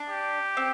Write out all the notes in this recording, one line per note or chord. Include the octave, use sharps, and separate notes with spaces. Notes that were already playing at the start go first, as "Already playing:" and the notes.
Already playing: D4
G4
C4